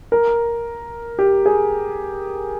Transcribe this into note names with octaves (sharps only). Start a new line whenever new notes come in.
A#4
G4
G#4